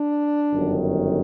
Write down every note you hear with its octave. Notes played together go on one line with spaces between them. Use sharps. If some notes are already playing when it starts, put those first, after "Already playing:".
Already playing: D4
G1 F#2 D#3